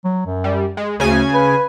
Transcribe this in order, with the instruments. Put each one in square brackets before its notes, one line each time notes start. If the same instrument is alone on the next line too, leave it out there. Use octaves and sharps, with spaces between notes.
[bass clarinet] F#3
F#2
[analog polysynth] G3
G#3
[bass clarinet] D2 [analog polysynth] C#3 G#5
[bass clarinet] B4